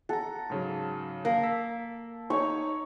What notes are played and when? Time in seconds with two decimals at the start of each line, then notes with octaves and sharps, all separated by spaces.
0.09 A4 F#5 A#5
0.50 G#2 C#3 F#3
1.25 A#3
1.43 E6 B6
2.30 D#4 C#5 C#6